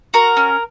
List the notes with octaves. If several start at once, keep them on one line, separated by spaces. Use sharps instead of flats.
F#4 A#4
C#4